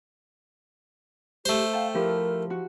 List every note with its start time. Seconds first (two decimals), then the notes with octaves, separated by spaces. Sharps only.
1.45 A3 G4 C5
1.73 F5 G5 A5
1.94 F3 E4 G4 A#4
2.50 F#4